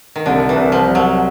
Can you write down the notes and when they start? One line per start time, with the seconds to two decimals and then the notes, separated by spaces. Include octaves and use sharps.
0.16 D#3
0.26 C2 D3
0.49 E3
0.56 C2
0.72 F3
0.87 C2
0.95 F#3